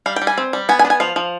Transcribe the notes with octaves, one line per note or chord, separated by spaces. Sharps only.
G3 F5
G5
G3
G#5
C4
G3
B3 G#5
G#5
D4
G#5
F3 F5
F3